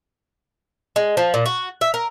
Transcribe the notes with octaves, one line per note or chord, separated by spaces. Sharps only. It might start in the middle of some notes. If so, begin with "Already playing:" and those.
G#3
F3
A#2
F#4
E5
A#4